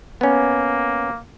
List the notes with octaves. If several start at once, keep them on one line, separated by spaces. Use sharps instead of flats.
A#3 B3 C#4